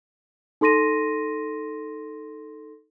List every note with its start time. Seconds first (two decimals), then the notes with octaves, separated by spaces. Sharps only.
0.61 D#4 A4 C6 A#6 D#7